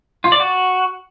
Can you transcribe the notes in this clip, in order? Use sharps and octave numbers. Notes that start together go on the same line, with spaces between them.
F4
D5
F#4